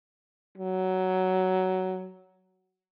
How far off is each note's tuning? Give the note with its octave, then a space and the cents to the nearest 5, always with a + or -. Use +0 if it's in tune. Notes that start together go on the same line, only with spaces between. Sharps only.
F#3 +10